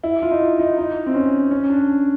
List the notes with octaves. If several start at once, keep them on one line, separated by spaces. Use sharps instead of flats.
E4
F4
D#4
E4
D#4
D#4
C4
C#4
C#4
D4